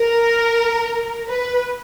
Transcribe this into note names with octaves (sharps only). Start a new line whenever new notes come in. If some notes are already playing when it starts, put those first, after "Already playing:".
Already playing: A#4
B4